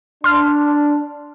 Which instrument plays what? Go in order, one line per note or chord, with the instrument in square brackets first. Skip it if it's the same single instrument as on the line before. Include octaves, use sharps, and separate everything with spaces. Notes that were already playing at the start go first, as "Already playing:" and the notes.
[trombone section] D4 [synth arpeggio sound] C6 F6